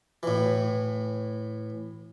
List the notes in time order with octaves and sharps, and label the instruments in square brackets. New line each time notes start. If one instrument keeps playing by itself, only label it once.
[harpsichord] A2 E3